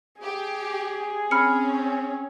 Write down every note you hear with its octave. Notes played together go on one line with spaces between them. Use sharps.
G4 G#4
C4 C#4 B5 F6 C#7